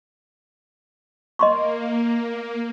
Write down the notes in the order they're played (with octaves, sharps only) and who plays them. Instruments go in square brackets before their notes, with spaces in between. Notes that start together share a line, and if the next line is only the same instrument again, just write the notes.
[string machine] A#3 [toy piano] D#5 C6 C#6